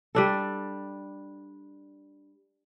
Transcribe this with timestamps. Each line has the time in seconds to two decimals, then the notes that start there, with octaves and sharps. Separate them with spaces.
0.15 G3 D4 A4